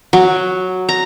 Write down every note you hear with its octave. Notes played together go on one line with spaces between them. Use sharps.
F#3
A#5